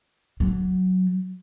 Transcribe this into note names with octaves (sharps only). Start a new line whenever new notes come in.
F#3